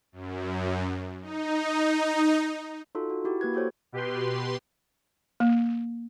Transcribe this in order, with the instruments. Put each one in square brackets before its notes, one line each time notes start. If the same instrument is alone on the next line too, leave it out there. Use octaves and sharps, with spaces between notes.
[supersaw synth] F#2
D#4
[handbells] D#4 F4 F#4 A4
F#4
E4 F#4 G4
A#3 B4 G#6
F#4 G4 A4 C5 C#5
[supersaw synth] B2 G4 B4 C6
[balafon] A#3